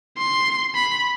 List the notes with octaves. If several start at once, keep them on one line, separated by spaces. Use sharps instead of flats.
C6
B5